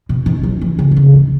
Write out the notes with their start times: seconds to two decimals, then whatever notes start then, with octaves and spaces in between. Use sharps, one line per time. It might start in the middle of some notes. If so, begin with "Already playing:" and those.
0.09 B2
0.26 D#3
0.43 F#3
0.61 E3
0.79 C#3
0.91 B2
0.97 C#3
1.14 D#3